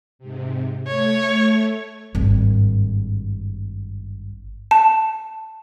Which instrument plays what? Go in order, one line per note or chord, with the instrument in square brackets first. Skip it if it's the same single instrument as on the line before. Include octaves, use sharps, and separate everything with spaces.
[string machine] G#2 C3
[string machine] A3 [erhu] C#5
[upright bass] G#1 G2
[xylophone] A5